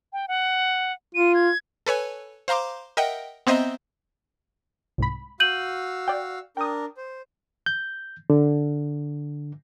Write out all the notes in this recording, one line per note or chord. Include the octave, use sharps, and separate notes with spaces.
G5
F#5
F4 D#7
G#6
A4 B4 C#5 G#5
C5 F5 A#5 C6 D6
A#4 D#5 E5 F#5 G5
B3 C4 C5 D#5 E5 A#5
C2 G#2 B5
F#4 F5 E6 G6 D#7 F#7
D5 G5
D4 A#4 G5 D#6
C5
G6
D3